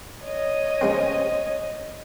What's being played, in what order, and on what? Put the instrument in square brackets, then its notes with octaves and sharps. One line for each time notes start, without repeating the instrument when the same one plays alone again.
[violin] C#5 D#5
[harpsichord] C#3 G#3 C4